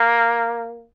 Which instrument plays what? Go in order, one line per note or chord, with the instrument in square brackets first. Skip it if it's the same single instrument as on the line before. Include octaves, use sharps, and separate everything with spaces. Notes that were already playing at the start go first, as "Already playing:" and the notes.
Already playing: [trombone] A#3